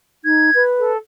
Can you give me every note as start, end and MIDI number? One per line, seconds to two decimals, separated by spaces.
0.24 0.50 63
0.24 0.62 92
0.55 0.91 71
0.79 0.97 69